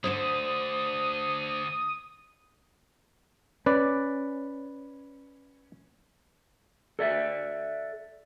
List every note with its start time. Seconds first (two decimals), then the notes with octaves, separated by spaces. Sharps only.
0.04 D2 G#2 D3 A3 C5 D#6
3.66 C#4 B4 D5
6.99 A4 D5 E5